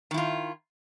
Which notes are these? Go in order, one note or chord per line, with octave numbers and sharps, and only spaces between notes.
D#3 E4 F4